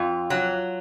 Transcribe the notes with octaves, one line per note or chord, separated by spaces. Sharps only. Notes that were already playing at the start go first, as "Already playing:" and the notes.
Already playing: F2 F4
F#3